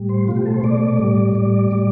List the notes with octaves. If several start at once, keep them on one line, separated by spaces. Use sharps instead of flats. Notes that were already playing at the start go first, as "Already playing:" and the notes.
Already playing: A2 G3
C5
B2 A3 F4
G4
A4
C5
B2 A3 D5
A2 G3
A2 G3 D5
A2 G3